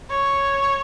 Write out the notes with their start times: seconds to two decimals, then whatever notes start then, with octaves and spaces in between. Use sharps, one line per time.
0.10 C#5